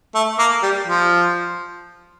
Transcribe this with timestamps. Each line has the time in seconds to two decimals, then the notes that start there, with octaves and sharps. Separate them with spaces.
0.15 A3
0.39 A#3
0.62 G3
0.87 F3